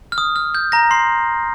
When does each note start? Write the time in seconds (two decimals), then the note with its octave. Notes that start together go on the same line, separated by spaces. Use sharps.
0.12 F6
0.18 D#6
0.36 F6
0.55 G6
0.72 A#5 A#6
0.91 C6 C7